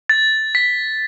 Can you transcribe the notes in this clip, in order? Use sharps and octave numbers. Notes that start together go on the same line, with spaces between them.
A6
B6